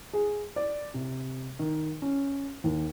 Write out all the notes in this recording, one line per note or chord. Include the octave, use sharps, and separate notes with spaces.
G#4
D5
C3
D#3
C#4
D#2